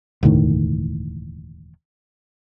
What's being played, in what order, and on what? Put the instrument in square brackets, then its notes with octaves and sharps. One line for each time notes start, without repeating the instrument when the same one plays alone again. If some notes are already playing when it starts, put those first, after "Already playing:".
[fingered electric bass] E1 D2 A2 D#3